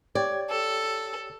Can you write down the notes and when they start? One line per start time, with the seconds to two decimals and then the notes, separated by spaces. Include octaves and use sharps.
0.15 G4 C#5 D5 G5 G#6
0.50 A4 E6